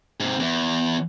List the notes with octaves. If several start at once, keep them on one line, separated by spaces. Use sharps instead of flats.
G#2 C3
E2